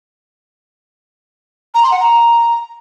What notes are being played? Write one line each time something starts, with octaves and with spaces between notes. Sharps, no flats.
A#5
C6
F#5
A#5